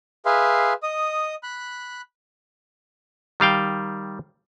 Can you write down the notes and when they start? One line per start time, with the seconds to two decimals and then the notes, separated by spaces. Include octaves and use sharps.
0.26 G#4 B4 E5 F5 C6
0.83 D#5 D#6
1.43 B5 F#6
3.40 D#3 G3 F5 G5